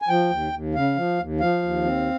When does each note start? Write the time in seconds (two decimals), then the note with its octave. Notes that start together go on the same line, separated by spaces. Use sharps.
0.02 G#5
0.08 F3 G5
0.31 D#2
0.53 D#2
0.75 C#3 F5
0.96 F3
1.19 D#2
1.40 F3 F5
1.63 D#2
1.85 C4